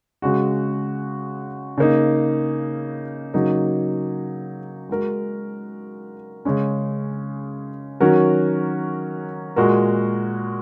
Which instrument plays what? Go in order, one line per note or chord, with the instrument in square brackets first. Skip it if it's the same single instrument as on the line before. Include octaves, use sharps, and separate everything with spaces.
[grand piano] C#3 G#3 F#4
C#3 A#3 D#4
C#3 F#3 A#3 D#4
G#3 F#4 A#4
C#3 G#3 C#4
D#3 F#3 C#4 F#4 A#4
A#2 G#3 F#4 A#4